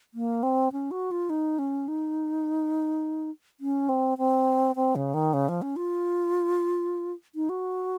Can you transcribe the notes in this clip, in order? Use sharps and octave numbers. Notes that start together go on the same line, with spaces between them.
A#3
C4
C#4
F#4
F4
D#4
C#4
D#4
C#4
C4
C4
C4
C#3
D#3
C#3
F3
C#4
F4
D#4
F#4